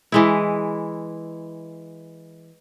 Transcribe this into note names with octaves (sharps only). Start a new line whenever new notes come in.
E3 G#3 E4